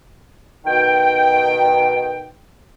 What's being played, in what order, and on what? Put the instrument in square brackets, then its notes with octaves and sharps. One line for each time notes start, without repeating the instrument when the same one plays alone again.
[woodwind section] B2 D#3 G5